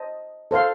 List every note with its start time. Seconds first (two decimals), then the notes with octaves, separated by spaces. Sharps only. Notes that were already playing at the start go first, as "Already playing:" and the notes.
Already playing: C5 D#5 A5
0.51 A4 C5 F5 C6